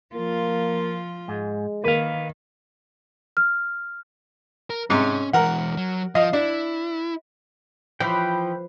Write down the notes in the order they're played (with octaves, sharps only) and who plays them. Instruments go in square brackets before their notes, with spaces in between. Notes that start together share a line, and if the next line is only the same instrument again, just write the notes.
[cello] F3 F4 [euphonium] A#3
[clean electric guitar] G#2 [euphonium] G#3
[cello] D#3 [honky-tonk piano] A#3 [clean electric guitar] B4 F5
[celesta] F6
[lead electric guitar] A#4
[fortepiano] G#2 C3 [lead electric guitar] C#4
[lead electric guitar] E3 G#3 [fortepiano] A#4 F#5
[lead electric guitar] F#3
[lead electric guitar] F3 [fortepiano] D#5 F5
[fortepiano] D4 [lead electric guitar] E4
[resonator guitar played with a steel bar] E3 [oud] F3 [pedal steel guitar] G5 B5